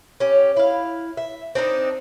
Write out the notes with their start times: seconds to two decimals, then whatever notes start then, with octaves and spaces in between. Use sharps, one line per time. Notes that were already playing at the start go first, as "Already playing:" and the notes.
0.20 C#4 G4
0.57 E4 F5
1.17 E5
1.55 C4 D4 D#4